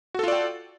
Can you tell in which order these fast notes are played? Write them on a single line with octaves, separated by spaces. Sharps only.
F#4 A4 F4 D5 G5